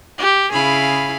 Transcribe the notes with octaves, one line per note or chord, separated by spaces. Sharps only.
G4
C#3 E4 G#4 F5 B5